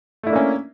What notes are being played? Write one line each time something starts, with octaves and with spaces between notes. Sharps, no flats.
A3 A#3 C#4 D4 E4